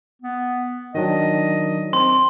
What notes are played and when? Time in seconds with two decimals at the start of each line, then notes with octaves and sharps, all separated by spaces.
0.22 B3
0.95 D#3 F#3 D4 D#5
1.93 C4 C6